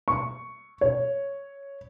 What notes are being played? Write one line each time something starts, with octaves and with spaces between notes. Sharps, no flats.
C#6
C#5